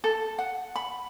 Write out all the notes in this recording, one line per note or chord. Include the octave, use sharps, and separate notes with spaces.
A4
F#5
B5